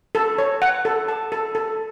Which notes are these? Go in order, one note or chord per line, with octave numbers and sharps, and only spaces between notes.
A4
C#5
F#5
A4
A5
A4
A4